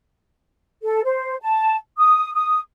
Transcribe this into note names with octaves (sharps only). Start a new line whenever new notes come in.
A4
C5
A5
D#6
D#6